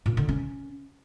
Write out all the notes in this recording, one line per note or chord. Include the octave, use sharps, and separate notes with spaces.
A#2
D3
C#4